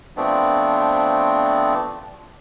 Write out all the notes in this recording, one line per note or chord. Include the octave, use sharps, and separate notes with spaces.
F3 A3 B3 C4 D4